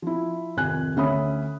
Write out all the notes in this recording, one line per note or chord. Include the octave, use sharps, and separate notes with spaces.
F3 E4
G#1 F2 C3 G#5 F#6
D2 C#4 E5 B5 D#6